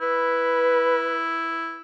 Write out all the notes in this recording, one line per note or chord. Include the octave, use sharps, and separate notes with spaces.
E4 B4